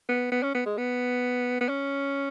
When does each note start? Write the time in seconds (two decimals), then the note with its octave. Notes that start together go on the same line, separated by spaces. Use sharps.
0.09 B3
0.32 B3
0.43 C#4
0.55 B3
0.66 G#3
0.78 B3
1.61 B3
1.69 C#4